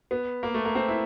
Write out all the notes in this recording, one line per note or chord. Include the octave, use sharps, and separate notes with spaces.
B3
A#3
A3
A#3
C4
E4